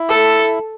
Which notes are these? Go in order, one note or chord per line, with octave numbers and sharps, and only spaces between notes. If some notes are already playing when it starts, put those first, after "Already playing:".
Already playing: E4
A4